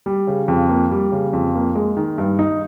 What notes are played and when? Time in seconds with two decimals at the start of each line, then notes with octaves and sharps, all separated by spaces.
0.06 G3
0.27 C#3
0.48 F2
0.69 A#3
0.91 G3
1.12 C#3
1.33 F2
1.55 A#3
1.75 G#3
1.97 D#3
2.18 G2
2.39 D#4